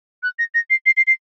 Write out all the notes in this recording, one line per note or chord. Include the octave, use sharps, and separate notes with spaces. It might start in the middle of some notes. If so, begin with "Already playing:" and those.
F#6
A#6
A#6
C7
C7
C7
C7